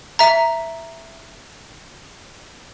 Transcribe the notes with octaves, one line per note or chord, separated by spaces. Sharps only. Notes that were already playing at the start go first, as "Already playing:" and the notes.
E5 A#5